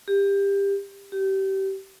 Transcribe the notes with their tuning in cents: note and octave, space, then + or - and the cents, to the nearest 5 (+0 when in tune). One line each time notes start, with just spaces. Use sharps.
G4 +20
G4 -25